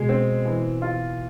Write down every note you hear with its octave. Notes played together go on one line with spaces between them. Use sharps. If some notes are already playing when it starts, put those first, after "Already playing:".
Already playing: B2 G#3
C4
E3
F4